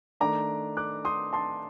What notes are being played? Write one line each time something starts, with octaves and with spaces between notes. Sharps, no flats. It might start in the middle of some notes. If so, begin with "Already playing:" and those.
D#3 A3 D4 A#5 D6
D6 F#6
C6 D#6
A5 C6